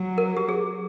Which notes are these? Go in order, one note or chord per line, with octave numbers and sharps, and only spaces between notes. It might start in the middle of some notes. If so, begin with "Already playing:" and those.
Already playing: F#3
A#4
G4
G#4